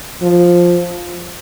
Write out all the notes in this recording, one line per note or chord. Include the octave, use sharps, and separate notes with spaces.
F3